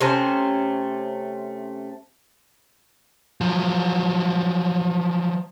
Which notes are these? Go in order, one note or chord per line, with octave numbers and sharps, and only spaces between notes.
C3 A3 C#4 C5
F3 F#3